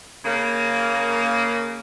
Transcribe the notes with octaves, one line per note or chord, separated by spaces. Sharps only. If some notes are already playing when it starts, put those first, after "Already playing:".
C#3 A#3